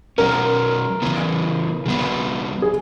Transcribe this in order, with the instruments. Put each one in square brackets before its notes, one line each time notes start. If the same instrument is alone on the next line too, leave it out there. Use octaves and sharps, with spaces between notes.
[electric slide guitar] B2 F#3 C#4 [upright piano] A#4
[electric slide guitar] C#3 E3 B3
C#3 F#3 B3
[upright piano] G#4